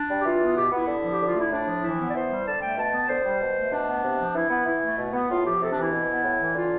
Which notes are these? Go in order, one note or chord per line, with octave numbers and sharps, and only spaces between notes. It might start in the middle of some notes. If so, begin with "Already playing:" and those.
Already playing: D4
G3
G4
E3 F4
B3
B2 G4
B3
E4
D3
F3
G4
D3 F4
A3 E4
A2 D4
F3
E3 E4
B3
D5
E3 C5
G3
D3 A5
A3 G5
B2 A5
B3
D3 C5
G3
B2
A3
B2 D4
B3
C3
F3
E3 E4
B3
E3 E4
A3
B2
B3
A2 F4
F3 G4
C3 A4
E3 D4
E4
B2
B3
A2
E3
D3 F4